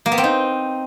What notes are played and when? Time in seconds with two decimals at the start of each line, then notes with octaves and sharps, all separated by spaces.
0.06 A#3
0.12 B3
0.18 C4
0.24 D#4